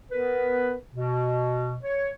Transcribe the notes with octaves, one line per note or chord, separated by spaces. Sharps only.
B3 A#4 B4
B2
C#5